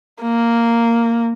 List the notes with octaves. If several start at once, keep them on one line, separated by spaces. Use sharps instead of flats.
A#3